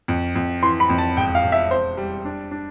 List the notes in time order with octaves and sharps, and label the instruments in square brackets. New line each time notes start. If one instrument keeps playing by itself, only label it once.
[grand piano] F2
F2
E3 C6
B5
F2
A5
E1 G5
F5
E1
E5
C4 C5
G3
D4
D4